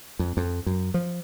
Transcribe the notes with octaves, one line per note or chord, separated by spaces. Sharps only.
F2
F2
F#2
F3